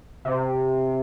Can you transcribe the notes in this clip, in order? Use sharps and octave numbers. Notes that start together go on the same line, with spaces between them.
C3